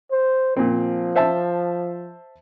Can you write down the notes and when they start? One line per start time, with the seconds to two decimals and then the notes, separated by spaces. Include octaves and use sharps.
0.11 C5
0.57 A#2 F3 C4
1.16 C5 E5 A5